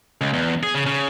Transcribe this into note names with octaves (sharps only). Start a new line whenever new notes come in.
C#2
E2
G#4
C#3
C#3